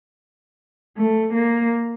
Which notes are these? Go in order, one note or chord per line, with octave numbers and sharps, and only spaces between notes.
A3
A#3